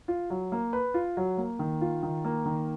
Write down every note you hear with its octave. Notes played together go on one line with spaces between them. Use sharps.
F4
F#3
A#3
B4
F4
F#3
A#3
D#3
F4
D#3
A#3
D#3